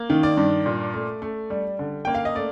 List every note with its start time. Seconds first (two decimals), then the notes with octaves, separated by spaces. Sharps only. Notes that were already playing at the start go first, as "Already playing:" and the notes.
Already playing: A#3
0.10 D#3
0.23 D5
0.37 G2
0.66 A#2
0.94 A3
1.22 A3
1.50 G3
1.79 D3
2.05 A#3 G5
2.15 F5
2.25 D#5
2.35 A3 D5